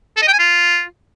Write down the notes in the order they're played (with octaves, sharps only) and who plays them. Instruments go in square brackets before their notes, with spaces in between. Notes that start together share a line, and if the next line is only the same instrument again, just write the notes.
[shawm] A4
D#5
G5
G#5
F4